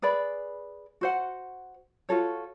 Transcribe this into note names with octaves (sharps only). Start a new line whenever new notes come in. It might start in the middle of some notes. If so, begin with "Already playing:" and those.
G#4 B4 D5 B5
F#4 C5 F#5
F4 F#4 A4 C#5